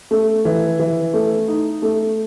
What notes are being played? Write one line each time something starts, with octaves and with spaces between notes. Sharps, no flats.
A3
E3
E3
A3
D#4
A3